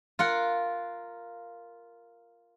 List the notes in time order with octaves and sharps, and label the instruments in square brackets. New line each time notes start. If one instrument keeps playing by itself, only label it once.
[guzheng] F4 A#4 F#5